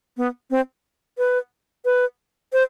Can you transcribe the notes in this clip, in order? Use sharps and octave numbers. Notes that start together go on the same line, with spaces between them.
B3
C4
B4
B4
C5